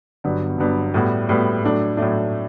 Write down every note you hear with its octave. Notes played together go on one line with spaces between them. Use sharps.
G1 G2 F#3 B3
G1 G2 F#3 B3
A2 G3 B3 F#4
A2 G3 B3 F#4
A2 F#3 A3 D4
A2 F#3 A3 D4